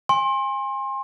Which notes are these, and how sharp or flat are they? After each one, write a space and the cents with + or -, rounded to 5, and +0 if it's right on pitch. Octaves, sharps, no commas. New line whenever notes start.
G#5 -30 C6 +30